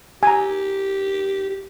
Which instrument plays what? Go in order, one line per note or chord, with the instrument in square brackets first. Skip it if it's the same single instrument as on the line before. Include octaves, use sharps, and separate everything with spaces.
[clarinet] G4 [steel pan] G#5 A#5
[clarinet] G4